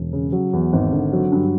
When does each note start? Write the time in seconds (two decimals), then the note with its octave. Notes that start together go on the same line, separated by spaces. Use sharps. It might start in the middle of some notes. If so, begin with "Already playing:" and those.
Already playing: E1
0.13 C#3
0.32 F#3
0.53 E2
0.73 G#1
0.92 D3
1.12 F#3
1.32 G2